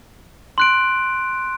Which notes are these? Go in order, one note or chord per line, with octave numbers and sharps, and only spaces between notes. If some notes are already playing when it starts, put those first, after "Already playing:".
C6 F#6 D7